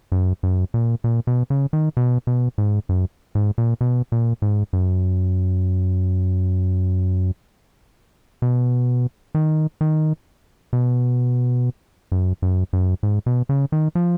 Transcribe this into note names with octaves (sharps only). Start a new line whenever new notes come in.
F#2
F#2
A#2
A#2
B2
C#3
D#3
B2
B2
G#2
F#2
G#2
A#2
B2
A#2
G#2
F#2
B2
D#3
D#3
B2
F#2
F#2
F#2
G#2
B2
C#3
D#3
F3